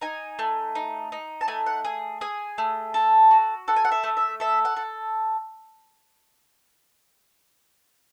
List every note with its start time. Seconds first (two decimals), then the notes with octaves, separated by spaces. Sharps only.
0.01 D#4 G#5
0.39 A3
0.75 D#4
1.12 D#4
1.41 A5
1.48 A3 G#5
1.66 F#5
1.85 G#4 G#5
2.21 G#4 G#5
2.58 A3
2.94 A4
3.31 F#4
3.68 A4 F#5
3.76 G#5
3.85 F#5
3.92 E5
4.04 A3
4.17 E5
4.40 A4 E5
4.65 F#5
4.77 A4